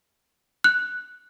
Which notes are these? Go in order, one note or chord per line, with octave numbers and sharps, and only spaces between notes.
F#6